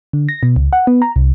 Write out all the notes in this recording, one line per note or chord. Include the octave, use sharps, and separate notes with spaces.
D3
A#6
B2
C#2
F#5
B3
A#5
C2